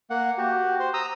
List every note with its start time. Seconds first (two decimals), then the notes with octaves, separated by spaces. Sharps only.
0.10 A#3 F#5
0.38 F#4 G4
0.79 C5
0.94 A#5 D#6 E6